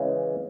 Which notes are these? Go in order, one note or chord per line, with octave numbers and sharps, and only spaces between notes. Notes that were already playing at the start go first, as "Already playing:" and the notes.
Already playing: C#3 E3 G#3